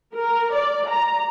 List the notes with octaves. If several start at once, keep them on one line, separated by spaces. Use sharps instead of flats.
A#4
D5
A#5